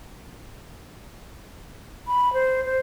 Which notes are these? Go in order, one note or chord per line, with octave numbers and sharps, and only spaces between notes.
B5
C5
C5